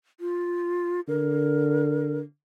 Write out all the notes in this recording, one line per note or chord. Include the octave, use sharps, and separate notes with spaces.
F4
D3 A#4